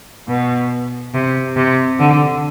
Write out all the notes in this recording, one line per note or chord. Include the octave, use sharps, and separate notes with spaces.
B2
C3
C3
D3